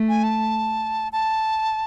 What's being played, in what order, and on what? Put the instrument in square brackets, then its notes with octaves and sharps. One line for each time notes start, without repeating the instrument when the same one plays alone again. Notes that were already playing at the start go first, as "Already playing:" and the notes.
Already playing: [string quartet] A3
[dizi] G#5
A5
A5